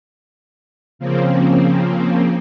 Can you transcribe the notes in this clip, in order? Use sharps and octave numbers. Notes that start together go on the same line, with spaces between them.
C#3 F3 A#3 C4